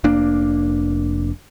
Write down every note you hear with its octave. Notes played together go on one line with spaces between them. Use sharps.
F1 A#3 D4